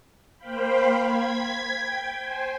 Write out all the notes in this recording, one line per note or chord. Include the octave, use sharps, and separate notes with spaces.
A#3 C5 F5 G5 B5
G#6 B6
G5
C5 G#5